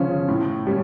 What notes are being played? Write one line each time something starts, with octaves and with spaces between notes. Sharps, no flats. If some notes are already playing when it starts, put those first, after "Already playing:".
Already playing: C#3 F3 C#4
A2
G3 C#4